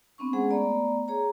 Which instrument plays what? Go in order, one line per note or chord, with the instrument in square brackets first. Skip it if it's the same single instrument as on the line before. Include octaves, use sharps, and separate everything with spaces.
[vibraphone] B3 C4 D4 C#6
G#3 C#4 G#4 C5 F#5
A3 B3 D5 A#5
G#4 C#5 A#5